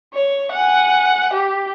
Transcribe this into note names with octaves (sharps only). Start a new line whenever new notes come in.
C#5
F#5 G#5
G4